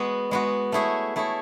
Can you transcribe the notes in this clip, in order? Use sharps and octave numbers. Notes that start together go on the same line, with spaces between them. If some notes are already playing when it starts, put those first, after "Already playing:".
Already playing: G#3 B3 F#4
G#3 B3 F#4
A3 E4 G#4 C#5
A3 E4 G#4 C#5